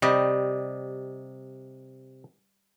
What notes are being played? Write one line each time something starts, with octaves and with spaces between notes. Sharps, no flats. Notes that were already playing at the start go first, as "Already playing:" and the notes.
C3 G3 D5 D#5